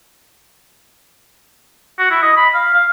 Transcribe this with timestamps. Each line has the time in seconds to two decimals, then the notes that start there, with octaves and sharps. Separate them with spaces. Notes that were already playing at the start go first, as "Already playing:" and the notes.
1.99 F#4
2.11 E4
2.22 D#5
2.37 B5
2.54 F5
2.74 F5